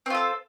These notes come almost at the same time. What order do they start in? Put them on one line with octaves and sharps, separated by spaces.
C4 F4 A4